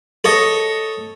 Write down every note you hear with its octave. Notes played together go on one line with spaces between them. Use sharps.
A4 C#5 D#5